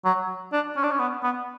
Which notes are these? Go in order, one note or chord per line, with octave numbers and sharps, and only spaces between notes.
F#3
D4
C#4
D4
C#4
B3
B3